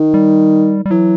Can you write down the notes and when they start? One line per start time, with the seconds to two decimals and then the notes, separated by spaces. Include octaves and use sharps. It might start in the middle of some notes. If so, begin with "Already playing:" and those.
Already playing: D#3
0.14 G3
0.86 G3
0.91 E3 F#3